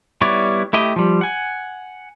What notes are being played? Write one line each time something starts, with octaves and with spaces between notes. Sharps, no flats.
G3 B3 E4 C#5 D5
A3 E4 G4 D#5
F3 G3
F#5 G#5